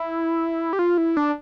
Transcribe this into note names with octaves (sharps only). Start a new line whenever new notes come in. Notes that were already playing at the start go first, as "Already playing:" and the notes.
Already playing: E4
G4
F4
E4
D4